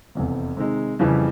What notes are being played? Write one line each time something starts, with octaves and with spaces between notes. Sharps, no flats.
F1 E2 C3
C3 D#3 G#3
F2 C#3 E3 G3